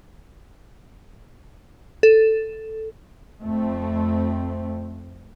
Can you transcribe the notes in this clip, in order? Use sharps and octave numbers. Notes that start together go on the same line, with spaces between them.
A4
F2 A3 C4